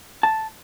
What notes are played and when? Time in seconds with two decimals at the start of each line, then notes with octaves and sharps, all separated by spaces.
0.23 A5